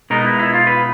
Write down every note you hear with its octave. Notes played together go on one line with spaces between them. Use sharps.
B2 G#3 B3 D#4 A#4
E4
E4
F4
B4